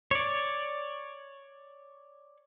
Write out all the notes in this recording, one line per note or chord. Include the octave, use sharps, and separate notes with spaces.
C#5 D5